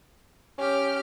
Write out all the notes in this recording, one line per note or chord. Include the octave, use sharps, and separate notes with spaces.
C#4 G4 F6